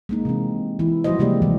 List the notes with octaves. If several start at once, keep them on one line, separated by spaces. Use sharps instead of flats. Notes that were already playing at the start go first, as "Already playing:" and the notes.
G#3 A#3 D#4
C3 E3 C4
E3 E4
F3 G3 E4 F#4 C5 D#5
C3 G3 G#3 A#3 G4 D5
C3 E3 F3 G3 G#3